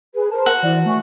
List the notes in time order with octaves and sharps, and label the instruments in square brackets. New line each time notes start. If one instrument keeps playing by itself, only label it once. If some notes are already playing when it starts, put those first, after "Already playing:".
[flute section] G#4 B4
[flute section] A#4 C5 [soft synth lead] A5
[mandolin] F#4
[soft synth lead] E3 [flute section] E4 D5
[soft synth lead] A3 [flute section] E5 G#5 C#6